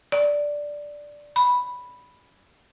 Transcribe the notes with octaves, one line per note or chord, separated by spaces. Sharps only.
D5
B5